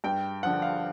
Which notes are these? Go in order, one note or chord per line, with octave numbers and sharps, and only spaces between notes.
G2 G5
D3 F3 F#5
F5